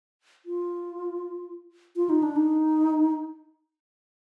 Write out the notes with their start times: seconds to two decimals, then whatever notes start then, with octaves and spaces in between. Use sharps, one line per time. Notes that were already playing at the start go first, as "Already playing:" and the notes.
0.46 F4
1.96 F4
2.09 D#4
2.23 D4
2.36 D#4